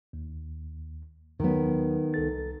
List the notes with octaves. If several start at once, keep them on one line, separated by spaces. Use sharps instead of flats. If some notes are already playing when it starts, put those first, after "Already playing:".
D#2
D#2 D#3 F#3 B3
C2 A4 A6